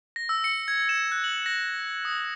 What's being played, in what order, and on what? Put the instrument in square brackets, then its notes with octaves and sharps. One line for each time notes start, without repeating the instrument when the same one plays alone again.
[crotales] A#6
E6
C#7
G#6
E7
F#6
F#7
A#6
D#6